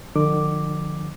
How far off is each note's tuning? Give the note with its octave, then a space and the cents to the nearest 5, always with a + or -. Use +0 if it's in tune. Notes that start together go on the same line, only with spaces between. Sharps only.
D3 +45 F3 +30 D6 +0